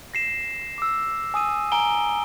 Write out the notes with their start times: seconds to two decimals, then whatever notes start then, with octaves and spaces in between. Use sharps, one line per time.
0.14 A#6 C7 E7
0.78 D6 E6
1.34 G#5 D#6 E6 D#7
1.72 G#5 A#5 D7 G7